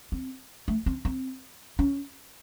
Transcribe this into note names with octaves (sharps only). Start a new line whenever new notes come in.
C4
A3
C4
C4
C#4